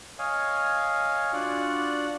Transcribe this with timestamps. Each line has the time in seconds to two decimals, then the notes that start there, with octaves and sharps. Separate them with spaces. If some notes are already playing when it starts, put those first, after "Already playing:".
0.19 C#5 D#5 F5 G#5
1.33 D4 F4 F#4 D5 F#5